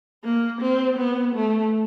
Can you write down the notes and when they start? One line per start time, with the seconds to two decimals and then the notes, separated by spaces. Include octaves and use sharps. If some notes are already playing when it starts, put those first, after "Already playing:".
0.24 A#3
0.61 C4
0.98 B3
1.35 A3